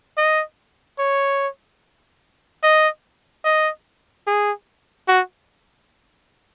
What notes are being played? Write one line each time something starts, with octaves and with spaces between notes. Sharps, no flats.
D#5
C#5
D#5
D#5
G#4
F#4